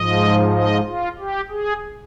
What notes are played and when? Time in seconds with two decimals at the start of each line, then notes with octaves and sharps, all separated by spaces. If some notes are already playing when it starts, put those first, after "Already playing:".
Already playing: G#2 F3 D#5
0.54 D#5
0.86 F4
1.19 G4
1.51 G#4